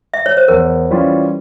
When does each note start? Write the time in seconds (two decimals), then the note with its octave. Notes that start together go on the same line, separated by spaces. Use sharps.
0.14 E5
0.26 C#5
0.37 C5
0.48 E2 A#4
0.91 E3 G3 C#4 F4